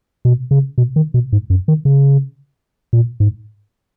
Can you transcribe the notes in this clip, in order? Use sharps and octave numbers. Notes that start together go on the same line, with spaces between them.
B2
C#3
B2
D#3
B2
G#2
F#2
D#3
C#3
A#2
G#2